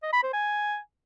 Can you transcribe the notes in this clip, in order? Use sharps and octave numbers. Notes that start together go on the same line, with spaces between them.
D#5
B5
C5
G#5